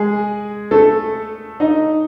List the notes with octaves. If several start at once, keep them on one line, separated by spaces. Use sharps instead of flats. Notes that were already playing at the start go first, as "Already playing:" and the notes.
Already playing: G#3 G#4
A3 A4
D#4 D#5